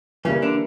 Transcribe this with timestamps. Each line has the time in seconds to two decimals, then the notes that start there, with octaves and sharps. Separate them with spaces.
0.25 C#3 E3 G3 A#3 C#4
0.42 D3 D4